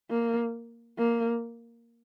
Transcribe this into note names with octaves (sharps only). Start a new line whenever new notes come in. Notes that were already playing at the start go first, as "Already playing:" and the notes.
A#3
A#3